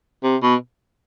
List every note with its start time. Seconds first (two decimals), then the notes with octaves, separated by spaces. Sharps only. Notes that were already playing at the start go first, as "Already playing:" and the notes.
0.24 C3
0.42 B2